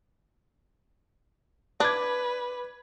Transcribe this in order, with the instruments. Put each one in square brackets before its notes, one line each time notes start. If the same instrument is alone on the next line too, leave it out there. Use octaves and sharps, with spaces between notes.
[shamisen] D4 [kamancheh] B4 [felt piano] D6 G#6